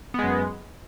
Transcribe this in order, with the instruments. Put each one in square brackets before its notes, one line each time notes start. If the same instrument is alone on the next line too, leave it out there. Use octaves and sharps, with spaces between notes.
[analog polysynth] B3
G#3
F#2